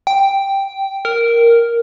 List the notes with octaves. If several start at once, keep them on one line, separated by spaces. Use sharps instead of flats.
G5
A#4